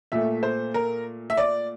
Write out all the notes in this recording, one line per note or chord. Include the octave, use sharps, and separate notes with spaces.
A#2 A3 E5
C5
A#4
E5
D5